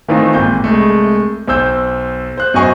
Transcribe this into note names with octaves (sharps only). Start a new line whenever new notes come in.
D#3 E3 A3 C4 D#4 F4
G#1 A#2 G6
C2 G#3 A3
B1 C5 E6 G6
C5 F#6
F#2 B2 C5 D#5 G#5 C#6